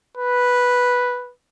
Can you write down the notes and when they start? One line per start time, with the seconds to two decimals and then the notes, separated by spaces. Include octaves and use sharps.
0.17 B4